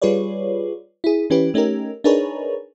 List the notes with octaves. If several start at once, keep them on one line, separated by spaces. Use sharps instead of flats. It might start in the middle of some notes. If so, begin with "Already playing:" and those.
G3 F4 G#4 B4 C#5 D5
E4 G#4
E3 C#4 E4 G4 B4
A3 C#4 D#4 G4 A#4
D4 D#4 G#4 A#4 B4 C#5